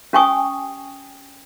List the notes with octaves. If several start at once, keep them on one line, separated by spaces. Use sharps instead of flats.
C#4 G4 G5 G#5 C#6 D#6